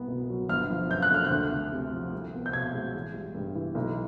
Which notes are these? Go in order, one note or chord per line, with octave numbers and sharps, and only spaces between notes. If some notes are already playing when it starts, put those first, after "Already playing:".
Already playing: C2 B3
B2
F#3
G1 F6
F3
F#2 G6
F#6
D3 F6
F#6
D2
A3
C3
F3
C2
B3
G6
B2 G#6
G#3
A1
G3
G2
E3
B1